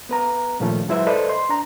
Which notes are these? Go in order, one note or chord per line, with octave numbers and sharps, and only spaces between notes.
B3 B4 A#5
A#2 D#3 F3 A3 C#4 F4
F#3 G#3 E4 B4 C5 E5
A4 B4 C5 D5 D#5
C6
D4 A#5